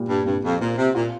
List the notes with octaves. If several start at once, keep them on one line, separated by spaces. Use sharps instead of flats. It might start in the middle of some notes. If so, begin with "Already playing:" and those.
Already playing: A#2 G3
G2
C2 G2
F2
A#2 C4
C3
A#2 F4